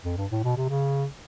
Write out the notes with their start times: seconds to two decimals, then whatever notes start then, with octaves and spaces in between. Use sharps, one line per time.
0.05 F2
0.17 G2
0.31 A2
0.44 B2
0.57 C3
0.69 C#3